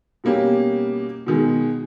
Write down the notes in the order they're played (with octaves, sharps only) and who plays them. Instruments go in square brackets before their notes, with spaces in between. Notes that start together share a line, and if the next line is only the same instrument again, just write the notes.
[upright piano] B2 G3 A#3 C#4 G4
B2 D#3 G#3